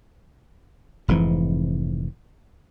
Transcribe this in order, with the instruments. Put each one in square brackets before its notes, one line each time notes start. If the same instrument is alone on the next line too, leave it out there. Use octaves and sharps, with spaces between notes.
[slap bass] F1 G#2 C3 E3